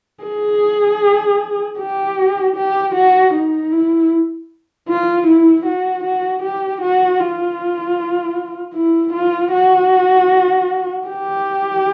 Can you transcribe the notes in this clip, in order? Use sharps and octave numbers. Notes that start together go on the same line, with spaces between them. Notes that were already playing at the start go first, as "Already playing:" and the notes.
G#4
G4
G4
F#4
D#4
E4
F4
E4
F#4
F#4
G4
F#4
F4
E4
F4
F#4
G4